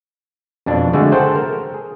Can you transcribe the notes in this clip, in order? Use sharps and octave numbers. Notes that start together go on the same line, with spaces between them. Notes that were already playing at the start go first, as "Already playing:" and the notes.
F2 B2 D4
D3 G#3 A3 F#4 G#4
A4 C5 F#5 G5 A5
A#4
G#4